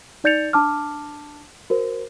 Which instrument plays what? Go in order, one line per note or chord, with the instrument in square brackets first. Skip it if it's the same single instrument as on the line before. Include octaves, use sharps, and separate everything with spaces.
[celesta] D#4 D5 G6 A6 C#7 F7
D4 A5 D6 F6
F#4 A#4 C5